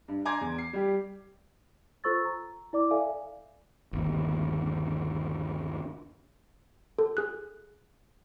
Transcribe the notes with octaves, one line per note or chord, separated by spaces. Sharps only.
G2
G#5 A#5 C6 D6 G#6
E2
C7
G3 G4
F4 A4 C5 C#6 E6 A6
A#5
E4 D5 D6
A4 D5 E5 F5 G#5
G1 D#2
A4
G#4 F#6